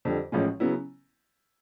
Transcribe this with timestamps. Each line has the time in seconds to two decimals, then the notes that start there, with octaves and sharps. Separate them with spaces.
0.05 F2 D3 G3
0.32 A1 A2 F3 G#3 C#4
0.60 C#3 F#3 B3 E4